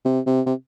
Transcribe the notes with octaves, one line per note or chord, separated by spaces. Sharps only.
C3
C3
C3